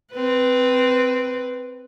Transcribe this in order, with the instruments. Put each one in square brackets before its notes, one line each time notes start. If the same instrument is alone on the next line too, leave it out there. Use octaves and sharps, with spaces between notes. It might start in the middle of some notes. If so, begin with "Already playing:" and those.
[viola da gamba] C4 B4